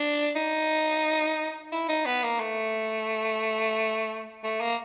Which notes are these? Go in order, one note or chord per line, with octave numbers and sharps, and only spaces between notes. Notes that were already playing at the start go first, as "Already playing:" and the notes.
Already playing: D4
D#4
E4
D#4
B3
A#3
A3
A3
A#3